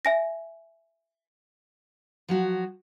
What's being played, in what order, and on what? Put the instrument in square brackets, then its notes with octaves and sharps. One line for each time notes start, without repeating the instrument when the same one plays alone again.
[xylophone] E5 G#5 A#6
[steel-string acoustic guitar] F3 F#3 F#4